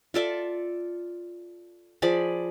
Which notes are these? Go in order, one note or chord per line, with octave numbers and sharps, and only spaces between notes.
F4 A4 D5 E5
F3 G#4 D5 B5